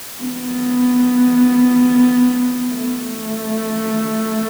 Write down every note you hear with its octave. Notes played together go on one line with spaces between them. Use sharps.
B3
A3